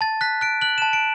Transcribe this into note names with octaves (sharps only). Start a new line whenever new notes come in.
A5 A6
F#6 B6
F#6 D7
F#6 F#7
A5 E7
D7